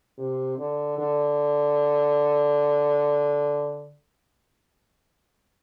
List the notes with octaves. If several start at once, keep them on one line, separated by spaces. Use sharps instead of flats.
C3
D3
D3